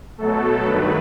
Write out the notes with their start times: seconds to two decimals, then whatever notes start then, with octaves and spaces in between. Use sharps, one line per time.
0.18 B2 F#3 A3 A4
0.64 G2 D#3 F#3 A3 B4